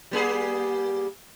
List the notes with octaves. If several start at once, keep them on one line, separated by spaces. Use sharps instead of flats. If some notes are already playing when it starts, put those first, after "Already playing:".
G3 A#3 G#4